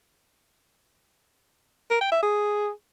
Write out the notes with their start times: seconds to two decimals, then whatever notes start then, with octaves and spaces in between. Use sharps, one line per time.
1.91 A#4
2.01 G5
2.12 E5
2.23 G#4